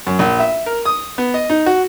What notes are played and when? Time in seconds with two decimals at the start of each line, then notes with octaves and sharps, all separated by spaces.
0.07 F#2
0.19 A#1
0.39 E5
0.66 A#4
0.85 D#6
1.18 B3
1.34 D#5
1.50 D#4
1.66 F#4